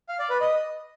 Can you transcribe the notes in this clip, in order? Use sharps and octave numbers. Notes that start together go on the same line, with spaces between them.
F5
D5
B4
D#5